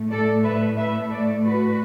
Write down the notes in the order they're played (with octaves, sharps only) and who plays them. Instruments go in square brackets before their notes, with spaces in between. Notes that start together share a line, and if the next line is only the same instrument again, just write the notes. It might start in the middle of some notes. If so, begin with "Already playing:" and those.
Already playing: [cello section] A2 A3
A4 D5
B4 E5
B4 E5
A4 D5
F#4 B4